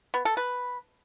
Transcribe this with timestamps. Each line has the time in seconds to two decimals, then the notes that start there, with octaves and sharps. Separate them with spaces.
0.14 B3
0.25 A4
0.37 B4